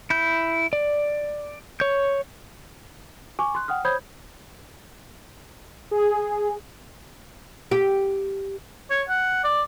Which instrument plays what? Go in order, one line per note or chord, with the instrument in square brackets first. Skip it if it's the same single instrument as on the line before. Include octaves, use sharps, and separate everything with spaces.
[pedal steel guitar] E4 G6
D5
C#5 G6
[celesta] G#5 C#6 D6
C6 F#6
F#5 G5 D#6 F6
C5 C#5 B5 D#6 G6 G#6
[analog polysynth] G#4
[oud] G4
[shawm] C#5
F#5
D5